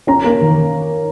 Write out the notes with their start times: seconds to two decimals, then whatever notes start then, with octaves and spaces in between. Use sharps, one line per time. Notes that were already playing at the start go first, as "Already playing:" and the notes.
0.07 C#4 A#5
0.24 A#3
0.40 D#3